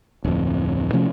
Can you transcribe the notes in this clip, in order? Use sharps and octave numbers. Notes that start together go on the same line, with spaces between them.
D1 F2
C3 F3 A3 C#4